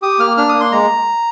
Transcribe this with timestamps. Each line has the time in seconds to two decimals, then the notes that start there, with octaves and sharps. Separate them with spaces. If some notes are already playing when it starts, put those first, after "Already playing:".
0.02 G4 D#6
0.19 A#3 F6
0.37 D4 F6
0.49 D#6
0.54 A#3
0.60 C6
0.72 G#3 A#5